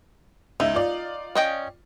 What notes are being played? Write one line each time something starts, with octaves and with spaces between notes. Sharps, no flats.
C#2 D#4 E5
F4 D5
C#4 D#5 G5